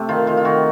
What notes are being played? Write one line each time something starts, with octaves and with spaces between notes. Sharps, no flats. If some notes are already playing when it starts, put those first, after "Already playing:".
Already playing: C3 A3 C4
D#3 F4
D#3 F4
F4
D#3 F#4